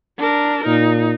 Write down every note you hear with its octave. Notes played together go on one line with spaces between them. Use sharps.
D4 A#4
A#2 D#4